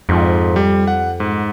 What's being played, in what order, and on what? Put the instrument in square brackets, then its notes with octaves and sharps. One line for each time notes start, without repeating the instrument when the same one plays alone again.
[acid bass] F2 [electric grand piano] G#2 F3
[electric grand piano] G3
F#5
G#2